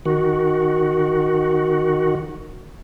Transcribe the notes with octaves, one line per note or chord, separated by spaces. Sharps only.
D#3 F#4